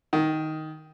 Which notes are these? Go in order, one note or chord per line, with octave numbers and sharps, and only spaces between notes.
D#3